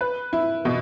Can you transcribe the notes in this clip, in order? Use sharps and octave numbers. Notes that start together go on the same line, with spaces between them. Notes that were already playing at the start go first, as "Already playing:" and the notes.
B4
E4
B2